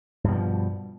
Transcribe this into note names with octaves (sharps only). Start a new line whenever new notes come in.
G2 B2 F3